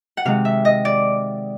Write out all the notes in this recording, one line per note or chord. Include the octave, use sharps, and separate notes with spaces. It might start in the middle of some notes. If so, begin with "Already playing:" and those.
F#5
C3 D#3 G#3 F5
E5
D#5
D5